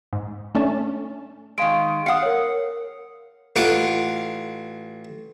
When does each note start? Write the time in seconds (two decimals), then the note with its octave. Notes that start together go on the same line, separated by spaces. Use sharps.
0.13 G#2
0.55 A3 C#4 D4 A5
1.58 D#3 G#3 F5 D7
2.06 F5 F#5 D#6 C#7
2.23 A#4 C#5
3.56 A1 F4 F#5 D6